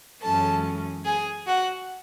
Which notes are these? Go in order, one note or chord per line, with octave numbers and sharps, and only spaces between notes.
F#2 E3 G#3 C#4 A4 A5
G#4 G#5
F#4 F#5